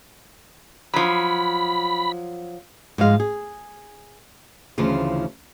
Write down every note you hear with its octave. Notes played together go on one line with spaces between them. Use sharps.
F3 F#3 B5
G#2 F3 G#3 F5
G#4
D2 C#3 E3 F3 F4